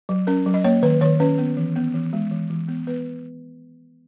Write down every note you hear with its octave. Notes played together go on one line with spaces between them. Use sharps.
F#3
C#4 A#4
F#3
D#5
A#3 C#5
D#3 B4
D#3 C#5
C#4 B4
B3
E3
B3
E3
G#3
E3
E3
B3
B3 B4